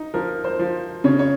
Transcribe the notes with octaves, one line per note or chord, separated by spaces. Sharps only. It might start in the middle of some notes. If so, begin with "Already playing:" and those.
Already playing: D#4
F3 A#4
C5
F3
C#3 C#5
C#5